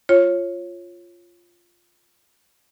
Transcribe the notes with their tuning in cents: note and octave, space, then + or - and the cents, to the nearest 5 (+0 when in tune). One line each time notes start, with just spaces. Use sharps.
F4 -5 C#5 -20